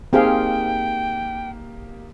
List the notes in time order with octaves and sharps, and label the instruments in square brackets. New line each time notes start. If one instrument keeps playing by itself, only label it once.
[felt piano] A#3 D#4 G4 [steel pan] C4 G#4 F5 [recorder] G5